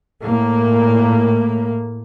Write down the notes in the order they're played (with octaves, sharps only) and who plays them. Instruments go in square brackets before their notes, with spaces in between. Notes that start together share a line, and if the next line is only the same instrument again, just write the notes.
[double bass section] A2 A#3